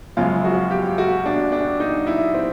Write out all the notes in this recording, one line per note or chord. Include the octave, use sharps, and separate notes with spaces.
F#2 C#3 F3 G#3 F4
F#4
G4
F#4
D4
D4
D#4
E4
C4